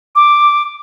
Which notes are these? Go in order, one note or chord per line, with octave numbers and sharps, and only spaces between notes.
D6